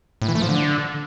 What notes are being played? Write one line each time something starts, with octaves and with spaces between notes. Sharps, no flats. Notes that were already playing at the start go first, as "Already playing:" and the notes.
A2
E3
A3
F3
D3